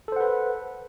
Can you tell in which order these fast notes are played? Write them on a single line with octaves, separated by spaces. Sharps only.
A4 C5 F#5 B4